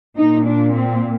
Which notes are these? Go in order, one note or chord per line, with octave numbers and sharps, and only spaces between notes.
A#2 D#4
D4
C4